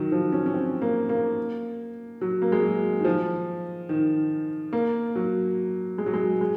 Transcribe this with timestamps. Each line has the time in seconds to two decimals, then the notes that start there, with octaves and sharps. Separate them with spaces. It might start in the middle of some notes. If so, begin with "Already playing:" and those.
Already playing: D#3 F#3
0.12 F3
0.32 C#4
0.46 C#4
0.54 C4
0.82 A#3
1.09 A#3
2.21 F#3
2.42 A#3
2.52 G#3
2.63 F#3
3.00 D#3
3.05 F3
3.89 D#3
4.73 A#3
5.15 F#3
5.98 G#3
6.06 F#3
6.13 G#3
6.41 G#3